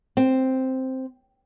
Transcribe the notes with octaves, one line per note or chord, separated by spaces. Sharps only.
C4